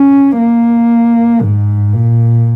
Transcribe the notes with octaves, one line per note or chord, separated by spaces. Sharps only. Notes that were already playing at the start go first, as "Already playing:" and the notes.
Already playing: C#4
A#3
G#2
A#2